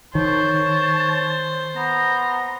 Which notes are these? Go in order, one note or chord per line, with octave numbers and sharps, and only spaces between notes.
D#3 C5 C#5 A5
B3 A#5